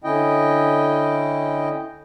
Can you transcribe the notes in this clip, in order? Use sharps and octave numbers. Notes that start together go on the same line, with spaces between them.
D3 C#4 E4 D#5 G5